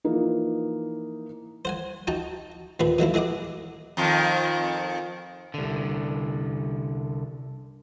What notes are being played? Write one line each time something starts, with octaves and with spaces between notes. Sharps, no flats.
E3 F3 A#3 D#4
C5 F#5 G#5
D#4 F#4 G5 A5
D#2 A#2 B3 B4
D#3 F#3 A#3 E4
E3 G#3 G#4 F#5 D6
F2 D#3 F4
C2 D3